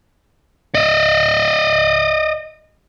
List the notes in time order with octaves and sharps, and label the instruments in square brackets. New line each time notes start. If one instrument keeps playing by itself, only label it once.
[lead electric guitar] D5 D#5